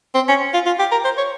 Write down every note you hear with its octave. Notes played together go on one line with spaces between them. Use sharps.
C4
C#4
F4
F4
G4
A#4
C5
C#5